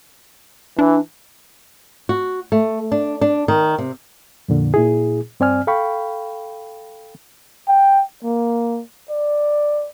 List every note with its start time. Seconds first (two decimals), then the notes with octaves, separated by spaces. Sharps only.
0.79 E3 D4
2.09 F#4
2.52 A3
2.92 D4
3.21 D4
3.48 D#3
3.78 C3
4.49 F2 A#2 D3
4.74 A#2 E4 G#4
5.40 G2 C4 D5 G#5 F6
5.67 A4 F5 G5 B5 C#6
7.68 G5
8.24 A#3
9.10 D5